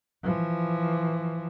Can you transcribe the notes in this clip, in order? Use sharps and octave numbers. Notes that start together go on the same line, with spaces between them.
E3 F3